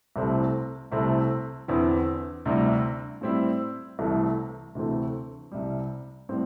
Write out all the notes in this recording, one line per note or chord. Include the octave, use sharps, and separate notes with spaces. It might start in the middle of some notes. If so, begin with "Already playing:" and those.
C2 C3 A3 C4 E4
C2 C3 A3 C4 E4
E2 D3 C4 E4
D2 C3 G3 E4
A2 G3 C4 E4
C2 C3 E3 A3
D2 C3 E3 A3 C4
C2 C3 G3
A2 G3 C4